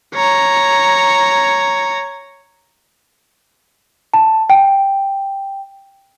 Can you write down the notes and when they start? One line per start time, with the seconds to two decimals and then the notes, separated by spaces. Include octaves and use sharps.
0.15 C#5 A#5
4.14 A5
4.50 G5